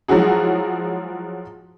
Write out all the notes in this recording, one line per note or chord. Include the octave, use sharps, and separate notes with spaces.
F3 F#3 G#3 E4 F#4 G#4